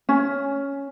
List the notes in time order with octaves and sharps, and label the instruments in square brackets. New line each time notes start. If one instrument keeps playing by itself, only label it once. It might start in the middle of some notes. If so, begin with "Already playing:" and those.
[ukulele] C#4